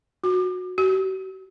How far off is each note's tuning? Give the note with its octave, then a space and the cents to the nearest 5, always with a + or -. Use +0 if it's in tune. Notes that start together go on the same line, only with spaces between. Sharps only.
F#4 -20
F#4 +45